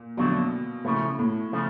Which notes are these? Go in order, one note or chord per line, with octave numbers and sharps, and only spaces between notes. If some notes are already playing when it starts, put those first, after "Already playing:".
Already playing: A#2
F2 B2 D3 F#3 A3 D4
A2 C#3 F3 A3
A2
C#3 F3 A3